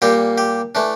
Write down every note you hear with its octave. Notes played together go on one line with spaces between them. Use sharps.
A#2 G3 A#3 G4
G4
E3 A3 D4